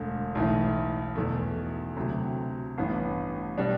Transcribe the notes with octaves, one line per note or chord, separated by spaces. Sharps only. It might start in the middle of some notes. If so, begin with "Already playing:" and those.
Already playing: E1 D2 D3
B1 A2 E3
E2 B2 A3
D2 C3 F#3
A1 G2 E3 B3
B2 G3 D4